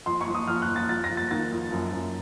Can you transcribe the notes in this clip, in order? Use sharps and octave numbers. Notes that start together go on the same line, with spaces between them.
F2 C6
C#6
F2
D#6
F2 F6
F#6
F2
A6
F2 A6
A#6
F2
A6
D#3 A6
F2
F#2
F#2